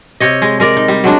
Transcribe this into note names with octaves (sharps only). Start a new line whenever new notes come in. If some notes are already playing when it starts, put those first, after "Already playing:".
C3 C#5 D#5
G#3
G#3 A#4 D5
D#4
G3
F#3 G#3 D4